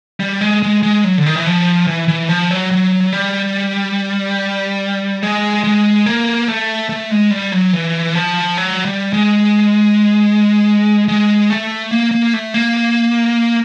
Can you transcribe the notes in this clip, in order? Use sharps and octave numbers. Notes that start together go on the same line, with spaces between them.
G3
G#3
G#3
G#3
F#3
D3
D#3
E3
F3
E3
E3
F3
F#3
F#3
G3
G#3
G#3
A#3
A3
A3
G#3
G3
F#3
E3
F3
F#3
G3
G#3
G#3
A3
A#3
A#3
A3
A#3